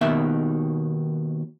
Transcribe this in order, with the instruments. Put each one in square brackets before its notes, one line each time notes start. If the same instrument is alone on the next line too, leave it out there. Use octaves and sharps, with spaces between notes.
[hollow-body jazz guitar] D#2 B2 D#3 E5